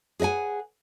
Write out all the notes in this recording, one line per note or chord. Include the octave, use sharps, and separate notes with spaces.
G#4 B4 D#5 F#5 G#5